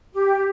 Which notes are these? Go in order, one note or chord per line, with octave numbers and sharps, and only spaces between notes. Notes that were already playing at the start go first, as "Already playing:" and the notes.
G4